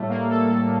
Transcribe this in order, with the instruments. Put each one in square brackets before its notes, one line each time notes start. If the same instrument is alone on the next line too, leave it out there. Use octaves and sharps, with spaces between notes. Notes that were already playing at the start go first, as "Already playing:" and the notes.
Already playing: [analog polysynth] A2 G3 A3
A#3
A4
A4